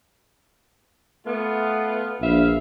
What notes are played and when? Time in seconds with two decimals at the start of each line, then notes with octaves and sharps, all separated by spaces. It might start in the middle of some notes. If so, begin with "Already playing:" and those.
1.26 A3 B3 F4
2.22 A#1 B4 E5 F5